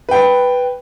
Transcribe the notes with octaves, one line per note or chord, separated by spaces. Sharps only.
B4 G5